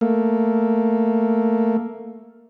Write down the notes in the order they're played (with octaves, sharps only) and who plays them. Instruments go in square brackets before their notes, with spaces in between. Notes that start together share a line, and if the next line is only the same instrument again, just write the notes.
[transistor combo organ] A3 A#3